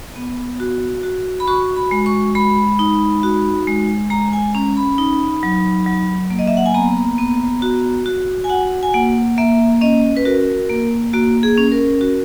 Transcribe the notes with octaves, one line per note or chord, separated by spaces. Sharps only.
B3
F#4
F#4
B5
F#4 C#6
B5
G#3
C#6
G#3 B5
D#4
F#4
G#3
G#3 A#5
G#5
C#4 A#5
B5
D#4
F#3
F#3
A#3
D#5
E5
F#5
G#5
B3 A#5
B3
F#4
F#4
G#5
F#4 F#5
G#5
A#3 F#5
A#3 E5
C#4 D#5
B4
F#4 A#4
A#3
A#3 F#4
G#4
C#4
A#4
F#4